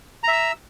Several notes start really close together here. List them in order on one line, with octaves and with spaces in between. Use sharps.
A#5 E5 E6